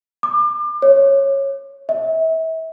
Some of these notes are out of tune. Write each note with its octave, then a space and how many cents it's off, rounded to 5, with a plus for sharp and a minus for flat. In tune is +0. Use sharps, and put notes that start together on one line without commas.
D6 +35
C#5 -15
E5 -35